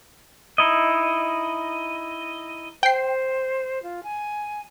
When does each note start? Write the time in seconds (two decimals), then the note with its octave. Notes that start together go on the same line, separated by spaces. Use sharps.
0.58 D#4 E4 D#5
2.83 C5 G5 C7
3.83 F4
4.03 G#5